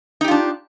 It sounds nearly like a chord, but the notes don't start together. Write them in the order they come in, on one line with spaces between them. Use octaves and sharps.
D#4 G4 F4 D4